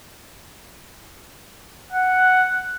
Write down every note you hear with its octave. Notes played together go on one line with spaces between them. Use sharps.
F#5